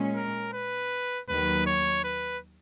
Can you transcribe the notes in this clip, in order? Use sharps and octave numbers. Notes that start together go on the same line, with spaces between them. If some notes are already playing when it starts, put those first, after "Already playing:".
Already playing: A#2 G#3 C#4
A#4
B4
D#2 D#3 F#3 B4
C#5
B4